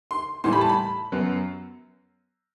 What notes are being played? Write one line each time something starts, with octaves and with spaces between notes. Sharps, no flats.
C6
A2 E3 G3 C6
B5
A5
B5
F#2 F#3 B3